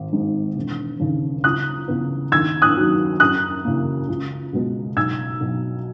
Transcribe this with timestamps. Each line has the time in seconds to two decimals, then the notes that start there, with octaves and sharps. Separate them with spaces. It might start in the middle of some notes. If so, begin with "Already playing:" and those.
Already playing: G#1
0.12 G#2 D#3 G#3
0.56 E1
1.00 D#2 C#3
1.44 C#2 D#6 F#6
1.88 C#3 E3 B3
2.32 D#2 E6 G#6
2.62 D#6 F#6
2.77 D#3 F#3
3.20 F#2 D#6 F#6
3.64 C#3 E3 A#3
4.08 C#2
4.53 B2 G#3 B3
4.96 B1 E6 G#6
5.41 B2 F#3